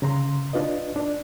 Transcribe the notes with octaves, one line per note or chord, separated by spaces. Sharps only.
C#3 A#5 C6
D4 F4 B4 D#5
D4